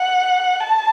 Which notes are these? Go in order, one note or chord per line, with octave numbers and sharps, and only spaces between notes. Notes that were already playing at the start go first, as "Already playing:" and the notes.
Already playing: F#5
A5